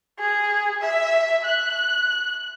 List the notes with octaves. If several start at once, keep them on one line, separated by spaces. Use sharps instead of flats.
G#4
E5
F#6